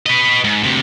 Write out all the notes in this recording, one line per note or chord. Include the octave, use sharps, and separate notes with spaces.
B4 D#5
G#2
D2 C3